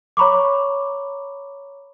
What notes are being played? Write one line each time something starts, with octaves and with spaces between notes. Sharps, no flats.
C#5 A#5 B5 C#6 D6